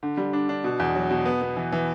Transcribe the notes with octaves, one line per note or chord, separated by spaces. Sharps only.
D3
G3
D4
D4
B2
E2
F#3
B2
B3
B3
E3
E3